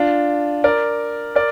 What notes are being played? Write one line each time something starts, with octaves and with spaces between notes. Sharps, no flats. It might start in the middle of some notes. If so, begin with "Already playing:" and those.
Already playing: D4 F4
A#4 D5
A#4 D5